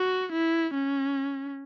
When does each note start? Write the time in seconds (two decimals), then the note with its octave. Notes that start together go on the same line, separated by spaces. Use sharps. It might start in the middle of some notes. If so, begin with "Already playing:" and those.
Already playing: F#4
0.32 E4
0.74 C#4